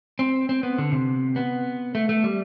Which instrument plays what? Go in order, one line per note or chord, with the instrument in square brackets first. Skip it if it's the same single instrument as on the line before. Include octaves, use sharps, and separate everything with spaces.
[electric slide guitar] C4
C4
B3
D3
C3
B3
A3
A3
G3